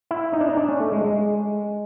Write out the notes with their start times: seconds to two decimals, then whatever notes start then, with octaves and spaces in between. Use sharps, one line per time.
0.11 E4
0.33 D#4
0.41 D4
0.49 D#4
0.57 D4
0.69 C#4
0.80 A3
0.92 G#3
1.04 G#3